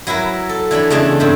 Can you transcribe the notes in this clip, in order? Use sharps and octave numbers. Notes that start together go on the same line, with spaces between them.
F#3 E4 A#4 B4
A4
E3 D4 C#5 B5
E2 C#3 G#3 A3 D4 A5
G2 A3 C4